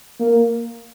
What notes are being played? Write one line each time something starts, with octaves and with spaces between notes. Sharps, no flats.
A#3